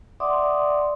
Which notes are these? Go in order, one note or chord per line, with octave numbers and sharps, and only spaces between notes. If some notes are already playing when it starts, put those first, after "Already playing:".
D5 E5 F#5 C6 D6 D#6